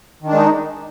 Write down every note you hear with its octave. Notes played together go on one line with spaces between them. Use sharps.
D#3 G#3 D4 D#4